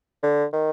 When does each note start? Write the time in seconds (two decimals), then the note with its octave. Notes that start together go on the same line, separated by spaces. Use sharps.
0.23 D3
0.53 D#3